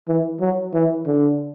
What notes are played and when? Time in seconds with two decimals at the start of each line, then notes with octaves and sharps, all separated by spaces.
0.08 E3
0.40 F#3
0.74 E3
1.06 D3